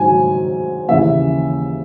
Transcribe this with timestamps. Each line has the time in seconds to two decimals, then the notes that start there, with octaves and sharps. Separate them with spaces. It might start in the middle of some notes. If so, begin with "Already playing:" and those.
Already playing: G#2 D#3 F#3 G#5
0.88 D#2 C#3 E3 A#3 E5